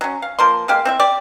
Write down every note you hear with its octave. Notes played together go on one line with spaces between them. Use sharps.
F#3 C#4
F5
F3 A#3 C6
G#3 A#3 G4 F5
C4 E4 E5
G4 D5